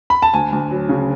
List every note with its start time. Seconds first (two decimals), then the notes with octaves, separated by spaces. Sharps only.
0.10 B5
0.22 A5
0.34 D2 G#5
0.52 D2
0.71 F#3
0.89 C#3